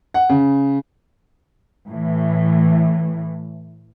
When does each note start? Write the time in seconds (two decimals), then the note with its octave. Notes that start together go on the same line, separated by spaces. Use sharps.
0.14 F#5
0.29 C#3
1.88 A2 E3